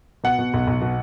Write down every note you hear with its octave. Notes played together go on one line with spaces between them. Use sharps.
B2 F#5
B2
B1
B1
B2